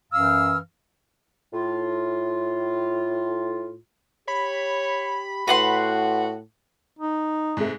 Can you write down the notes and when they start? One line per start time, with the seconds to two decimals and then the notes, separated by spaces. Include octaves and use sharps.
0.12 F#2 E3 F5 E6 F6
1.54 A2 F4
4.28 G4 C#5 B5
5.47 A2 F#4 B4 F#5 C6
6.99 D#4
7.57 G#2 C3 A3